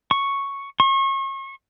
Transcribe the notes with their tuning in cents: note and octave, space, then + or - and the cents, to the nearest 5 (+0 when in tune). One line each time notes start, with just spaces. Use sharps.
C#6 +0
C#6 -35